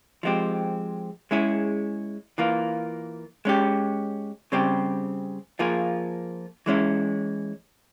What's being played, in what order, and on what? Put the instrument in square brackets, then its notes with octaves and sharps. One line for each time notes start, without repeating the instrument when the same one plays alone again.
[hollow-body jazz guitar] F3 G#3 C4 G4
G#3 C#4 E4 G#4
E3 A#3 F4
G#3 C#4 G4
C#3 G3 C4 G4
F3 A#3 F4 G#4
E3 G#3 C#4 E4